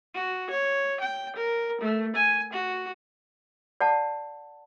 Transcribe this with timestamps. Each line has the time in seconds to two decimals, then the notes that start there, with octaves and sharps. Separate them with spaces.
0.15 F#4
0.50 C#5
1.01 G5
1.36 A#4
1.81 A3
2.16 G#5
2.53 F#4
3.81 D5 F#5 A5